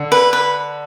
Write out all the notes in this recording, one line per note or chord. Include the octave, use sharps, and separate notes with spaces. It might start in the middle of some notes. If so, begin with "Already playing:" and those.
Already playing: D3
B4
B4